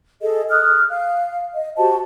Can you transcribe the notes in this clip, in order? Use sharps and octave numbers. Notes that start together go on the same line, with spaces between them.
G#4 A4 D#5
D#6 F6 F#6
F5
D#5
F#4 G4 C5 A5